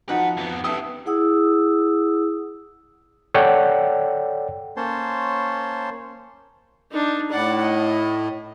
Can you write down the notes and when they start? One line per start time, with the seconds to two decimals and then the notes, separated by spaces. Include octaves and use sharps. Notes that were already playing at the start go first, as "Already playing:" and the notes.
0.09 F3 D#4 F#4 B4 F#5
0.37 F2 B3
0.64 B3 G4 A4 E5 D#6
1.06 E4 G#4 F#5 D#6 E6
3.34 A4 C#5 D5 F#5 G5
4.77 A#3 C#4 C5 C#5 A5 C6
6.91 D4 D#4
7.31 A2 D5 F#5
7.63 D#5